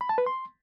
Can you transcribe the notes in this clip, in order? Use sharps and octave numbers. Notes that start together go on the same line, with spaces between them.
B5
A5
B4
C6